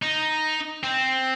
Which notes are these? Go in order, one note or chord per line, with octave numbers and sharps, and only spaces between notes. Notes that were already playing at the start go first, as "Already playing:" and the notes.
D#4
C4